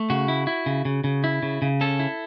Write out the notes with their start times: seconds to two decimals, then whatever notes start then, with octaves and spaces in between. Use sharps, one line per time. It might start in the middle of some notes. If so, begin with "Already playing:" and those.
Already playing: A3
0.10 C#3 F#4
0.28 E4
0.47 E4
0.66 C#3
0.85 C#3
1.04 C#3
1.24 E4
1.43 C#3
1.62 C#3
1.81 C#4 A4
2.00 E4